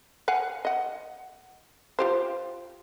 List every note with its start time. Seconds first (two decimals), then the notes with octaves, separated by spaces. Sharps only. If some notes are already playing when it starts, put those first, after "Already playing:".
0.28 F5 F#5 G#5
0.65 D#5 F#5
1.99 F4 G4 C5